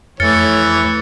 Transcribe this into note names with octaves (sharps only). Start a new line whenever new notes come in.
F2 E3 A3 C#5 F6 A6 C#7